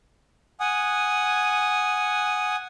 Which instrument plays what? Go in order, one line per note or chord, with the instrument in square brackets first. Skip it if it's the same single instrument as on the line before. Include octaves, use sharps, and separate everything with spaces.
[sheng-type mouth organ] F#5 G#5 D#6